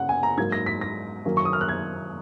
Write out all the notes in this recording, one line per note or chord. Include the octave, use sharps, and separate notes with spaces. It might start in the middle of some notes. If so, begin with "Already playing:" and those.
Already playing: C#3 C#4 F#5
G#5
A#5
G#2 F#3 A#3 G#6
A#6
B6
A#6
F#2 D#3 F#3 A#3 C#4
C#6
D#6
F6
F#6
G#6